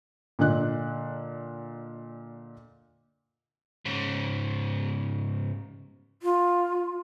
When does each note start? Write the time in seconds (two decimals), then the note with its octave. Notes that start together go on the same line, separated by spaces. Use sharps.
0.39 A#2 D3 D#5 F#6
3.85 G#2 C#3
6.22 F4